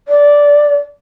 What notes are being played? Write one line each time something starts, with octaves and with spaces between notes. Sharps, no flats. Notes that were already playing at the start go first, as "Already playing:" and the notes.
D5